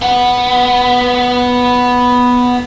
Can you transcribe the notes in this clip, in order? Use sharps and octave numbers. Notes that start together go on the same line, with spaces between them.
B3 F#5